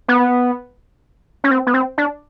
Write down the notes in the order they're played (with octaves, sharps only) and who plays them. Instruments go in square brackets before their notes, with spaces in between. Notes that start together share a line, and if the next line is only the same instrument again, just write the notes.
[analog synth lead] B3
C#4
C4
B3
C4
D4